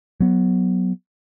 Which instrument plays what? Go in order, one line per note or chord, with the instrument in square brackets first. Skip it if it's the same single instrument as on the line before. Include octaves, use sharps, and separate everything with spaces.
[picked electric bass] F#3 B3